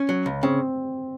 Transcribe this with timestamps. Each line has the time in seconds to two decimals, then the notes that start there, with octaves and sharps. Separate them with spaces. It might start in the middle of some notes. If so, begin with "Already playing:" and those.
Already playing: C#4
0.09 F#3
0.26 C#2
0.43 C#3 C4